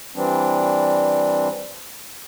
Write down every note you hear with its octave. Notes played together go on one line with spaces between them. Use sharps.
E3 G3 C4 D4